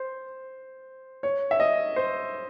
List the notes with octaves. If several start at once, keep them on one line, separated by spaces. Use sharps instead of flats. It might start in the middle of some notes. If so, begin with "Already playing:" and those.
Already playing: C5
C#5
E5
D#5
C5